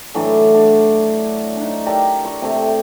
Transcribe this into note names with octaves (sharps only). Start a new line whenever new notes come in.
A2 E3 F#3 D4
D4
D4 D#4
G4 A4 A#4 D5
C#6
C3 A3